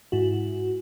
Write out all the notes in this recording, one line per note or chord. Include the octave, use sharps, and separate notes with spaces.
G#2 E4 F#4